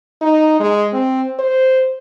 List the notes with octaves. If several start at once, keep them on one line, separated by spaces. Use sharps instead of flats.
D#4
G#3
C4
C5